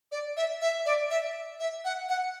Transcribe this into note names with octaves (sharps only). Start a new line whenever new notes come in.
D5
E5
E5
D5
E5
E5
F#5
F#5